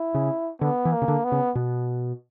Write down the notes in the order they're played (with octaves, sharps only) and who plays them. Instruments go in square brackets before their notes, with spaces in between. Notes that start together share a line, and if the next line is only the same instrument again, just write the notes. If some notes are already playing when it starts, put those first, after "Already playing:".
Already playing: [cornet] E4
[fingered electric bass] C#3
[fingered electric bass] D3 [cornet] B3
[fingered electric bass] E3
[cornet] A#3
[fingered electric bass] C#3
D3
[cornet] B3
[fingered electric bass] C#3
B2